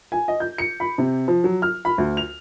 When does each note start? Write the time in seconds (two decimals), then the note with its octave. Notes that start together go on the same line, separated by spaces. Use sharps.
0.12 G#5
0.28 D#5
0.40 G6
0.58 C#7
0.80 B5
0.98 C3
1.28 F3
1.44 F#3
1.62 F6
1.85 B5
1.98 D2
2.17 F7